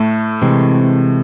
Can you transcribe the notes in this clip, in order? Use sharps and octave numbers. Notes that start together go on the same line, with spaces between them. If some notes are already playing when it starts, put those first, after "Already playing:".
Already playing: A2 A3
C3 E3 G#3 C4